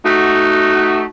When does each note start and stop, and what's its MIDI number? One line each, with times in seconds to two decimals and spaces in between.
0.04 1.03 57
0.04 1.03 63
0.04 1.03 66